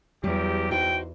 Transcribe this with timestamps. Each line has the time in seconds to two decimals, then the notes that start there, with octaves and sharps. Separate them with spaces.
0.24 E2 F#3 G3 G4
0.71 D#4 F#4 C5 G5